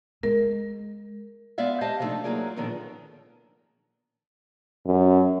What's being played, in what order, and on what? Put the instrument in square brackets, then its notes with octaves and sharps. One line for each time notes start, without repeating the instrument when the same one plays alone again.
[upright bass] G#3 [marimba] A#4
[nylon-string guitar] G#3 B3 D5 E5 F5
G4 C5 D#5 F5 A5
C3 F3 G3 A3 D4 D#4
F#3 A#3 F4 G#4 D5
A#2 D3 D#3 F3 B3 C#4
[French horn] F#2